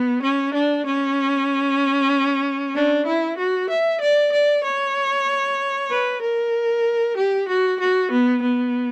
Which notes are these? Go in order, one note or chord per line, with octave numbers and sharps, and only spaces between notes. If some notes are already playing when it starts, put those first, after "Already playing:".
Already playing: B3
C#4
D4
C#4
D4
E4
F#4
E5
D5
D5
C#5
B4
A#4
G4
F#4
F#4
B3
B3